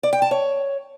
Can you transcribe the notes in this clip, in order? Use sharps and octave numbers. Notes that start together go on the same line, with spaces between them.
D5
G5
A5
C#5